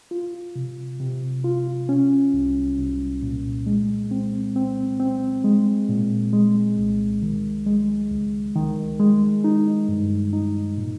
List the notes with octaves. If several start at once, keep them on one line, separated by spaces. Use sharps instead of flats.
F4
C3
C3
F4
C#4
C2
C2
A#2
G#3
C4
C4
C4
G#3
A#2
G#3
C2
D#3
G#3
C#2
D#3
G#3
D#4
G2
D#4
A#2